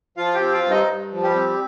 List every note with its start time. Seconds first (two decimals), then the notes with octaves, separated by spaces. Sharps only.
0.17 F3 F4 F5
0.34 G4 G5
0.41 C4
0.53 F4 F5
0.64 G2
0.71 D#4 D#5
0.88 G2
1.12 F3
1.23 G3 G4
1.35 C4